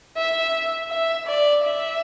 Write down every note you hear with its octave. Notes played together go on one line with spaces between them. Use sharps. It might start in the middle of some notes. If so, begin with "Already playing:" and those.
E5
E5
D5
E5